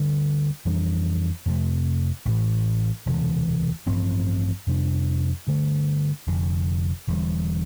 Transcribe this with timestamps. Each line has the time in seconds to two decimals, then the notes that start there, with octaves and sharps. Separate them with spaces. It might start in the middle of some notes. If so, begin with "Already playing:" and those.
Already playing: D2 D3 G3 D4
0.65 F2 E3 G3 D4
1.46 F2 C3 F3 A3
2.25 A1 A2 E3
3.06 E1 D2 C3 E3
3.86 A1 G2 F3 C4
4.67 F2 C3 G3 D4
5.47 G2 D3 A3
6.27 F1 F2 D3
7.07 E1 E2 D3 G3